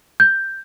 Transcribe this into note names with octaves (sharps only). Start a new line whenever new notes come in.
G6